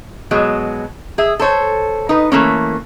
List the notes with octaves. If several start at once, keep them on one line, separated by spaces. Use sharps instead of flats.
B2 F#3 G#3
G#4 E5
A4 C5 C#5
D#4 B4
E3 A3 A#3 C#4